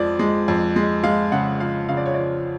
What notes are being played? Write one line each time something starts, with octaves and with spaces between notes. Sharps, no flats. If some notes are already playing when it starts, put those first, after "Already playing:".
Already playing: F2 F3 G#3 D5
G#3
F2
G#3
G#3 F5
C#3 F#5
F3 F5
C#3 F5
D5
C#5
F3 D5